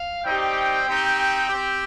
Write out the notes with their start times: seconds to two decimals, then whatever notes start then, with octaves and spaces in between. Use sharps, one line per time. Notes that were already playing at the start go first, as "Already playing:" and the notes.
Already playing: F5
0.24 G3 C4 D#4 G4 G5
0.87 C4 D#4 G4
1.17 G5
1.48 C4 G4